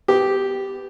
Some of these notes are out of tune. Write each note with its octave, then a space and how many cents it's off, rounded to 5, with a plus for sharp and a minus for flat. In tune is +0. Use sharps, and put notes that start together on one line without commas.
B3 +25 G4 -5